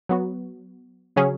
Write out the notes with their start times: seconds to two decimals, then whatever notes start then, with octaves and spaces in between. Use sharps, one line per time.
0.09 F#3 B3 F#4
1.16 C#3 F#3 C#4 G#4